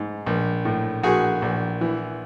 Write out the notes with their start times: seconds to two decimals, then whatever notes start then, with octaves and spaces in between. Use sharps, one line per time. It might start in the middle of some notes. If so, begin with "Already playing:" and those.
Already playing: G#2
0.26 A#1
0.65 A2
1.03 A#1 F#4 G#4
1.42 A#1
1.81 E3